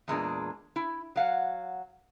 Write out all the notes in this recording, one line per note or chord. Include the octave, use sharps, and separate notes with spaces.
E2 A#2 G#3 D4
E4
F#3 F5 F#5